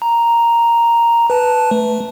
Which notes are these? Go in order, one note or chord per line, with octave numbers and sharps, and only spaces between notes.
A#5
B4 A5
A3